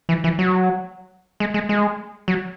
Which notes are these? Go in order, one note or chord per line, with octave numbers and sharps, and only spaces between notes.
E3
E3
F#3
G#3
G#3
G#3
F#3